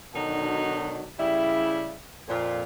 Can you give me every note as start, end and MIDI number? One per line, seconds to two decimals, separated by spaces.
0.14 1.10 47
0.14 1.10 50
0.14 1.10 51
0.14 1.10 54
0.14 1.10 62
0.14 1.10 63
1.19 1.95 49
1.19 1.95 55
1.19 1.95 64
2.28 2.63 41
2.28 2.63 46
2.28 2.63 65